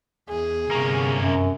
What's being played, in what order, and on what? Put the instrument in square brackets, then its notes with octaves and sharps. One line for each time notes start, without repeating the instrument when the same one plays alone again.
[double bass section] E2 [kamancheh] G#4
[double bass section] G1 C3 [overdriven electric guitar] A#3 C#4
[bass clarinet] F#2